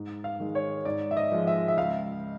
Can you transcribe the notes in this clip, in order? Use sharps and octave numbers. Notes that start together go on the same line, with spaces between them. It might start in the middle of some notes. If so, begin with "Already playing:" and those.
Already playing: G#2
F5
D#3 G#3
C#5
G#2 D5
E5
D#5
F3 G#3
E5
E5
C#2 F5